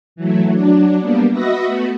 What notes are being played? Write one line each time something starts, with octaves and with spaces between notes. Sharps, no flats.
E3 F#3 A3
F#3 D4
G3 A#3 B3 D4
F#4 B4 D#5 E5 A#6
A3 B3 F#4